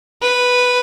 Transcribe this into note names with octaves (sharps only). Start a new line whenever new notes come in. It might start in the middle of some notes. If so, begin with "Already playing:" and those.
B4